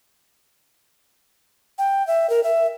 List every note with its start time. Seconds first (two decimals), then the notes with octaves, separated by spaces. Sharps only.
1.78 G5
2.07 E5
2.30 A#4
2.44 E5